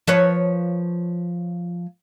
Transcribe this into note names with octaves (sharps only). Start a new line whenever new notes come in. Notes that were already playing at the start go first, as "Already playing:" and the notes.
F3 B4 C#5